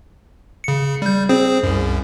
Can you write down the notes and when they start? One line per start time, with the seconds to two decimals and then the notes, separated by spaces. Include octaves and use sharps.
0.64 C#3 C#7
1.02 G3 G6
1.29 C4 G#4 C5
1.63 C2 F#2